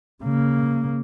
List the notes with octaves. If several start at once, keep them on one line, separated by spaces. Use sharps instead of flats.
C#3 A#3